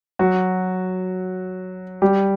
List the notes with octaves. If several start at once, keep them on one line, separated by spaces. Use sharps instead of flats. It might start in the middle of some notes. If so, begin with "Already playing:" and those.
F#3 F#4
G3 G4